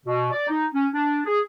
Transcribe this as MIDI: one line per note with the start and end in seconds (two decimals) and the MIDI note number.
0.06 0.31 47
0.31 0.45 74
0.48 0.65 63
0.74 0.86 61
0.94 1.20 62
1.25 1.40 68